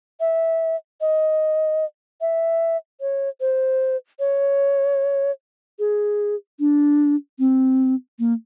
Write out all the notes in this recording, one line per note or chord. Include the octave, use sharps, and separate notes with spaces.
E5
D#5
E5
C#5
C5
C#5
G#4
D4
C4
A#3